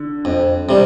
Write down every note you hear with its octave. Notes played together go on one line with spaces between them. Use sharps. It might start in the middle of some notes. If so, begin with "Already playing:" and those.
Already playing: D3
F2
C3 G3